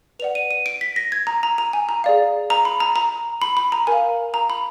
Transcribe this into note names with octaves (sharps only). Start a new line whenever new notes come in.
B4 D5 F#5 F7
D#7
D#7
D7
B6
A#6
G#6
A#5
A#5
A#5
G#5
A#5
G#4 D5 F5
A#5
B5
A#5
A#5
B5
B5
A#5
A#4 F5 G#5
A#5
B5